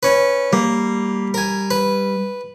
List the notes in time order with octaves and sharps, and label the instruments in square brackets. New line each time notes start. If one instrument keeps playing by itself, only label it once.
[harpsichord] C#4 B4
[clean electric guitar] G3 [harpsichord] A#3
[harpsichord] A#4 G#5
B4